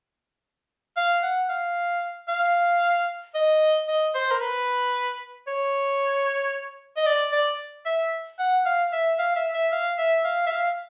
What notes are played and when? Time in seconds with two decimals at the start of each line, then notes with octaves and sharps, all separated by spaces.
0.97 F5
1.23 F#5
1.50 F5
2.29 F5
3.35 D#5
3.88 D#5
4.15 C5
4.31 A#4
4.41 B4
5.48 C#5
6.97 D#5
7.06 D5
7.33 D5
7.86 E5
8.39 F#5
8.66 F5
8.93 E5
9.19 F5
9.36 E5
9.54 E5
9.72 F5
9.98 E5
10.25 F5
10.47 E5
10.51 F5